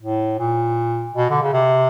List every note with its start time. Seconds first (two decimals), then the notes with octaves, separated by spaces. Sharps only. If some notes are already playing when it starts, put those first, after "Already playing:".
0.01 A2
0.39 A#2
1.15 B2
1.30 D3
1.42 C#3
1.53 C3